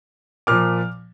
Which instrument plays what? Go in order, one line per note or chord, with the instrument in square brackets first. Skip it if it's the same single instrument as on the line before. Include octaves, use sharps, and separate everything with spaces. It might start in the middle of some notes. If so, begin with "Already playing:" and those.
[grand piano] A#2 F3 D6 F6